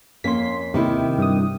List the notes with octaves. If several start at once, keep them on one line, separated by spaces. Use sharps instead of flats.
F2 A#3 C#4 C6 B6
D#2 C3 D#3 E4
G2 D#6